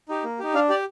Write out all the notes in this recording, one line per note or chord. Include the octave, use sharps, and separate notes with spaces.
D#4 G4
A#3
D#4 G4
D4 F5
G4 D5